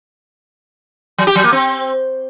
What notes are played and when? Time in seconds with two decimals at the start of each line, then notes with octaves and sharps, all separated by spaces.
1.18 F#3
1.27 G4
1.35 F#3
1.44 A#3
1.52 C4